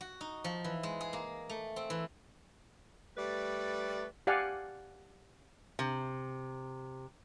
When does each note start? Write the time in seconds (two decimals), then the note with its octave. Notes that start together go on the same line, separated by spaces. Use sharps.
0.01 F#4
0.21 D#4
0.44 F3
0.64 E3
0.83 G#3
1.01 G#4
1.13 A#3
1.49 A3
1.76 C4
1.90 E3
3.16 G3 A3 B4 D5
4.27 G4 D5 F5 F#5 G#5
5.79 C3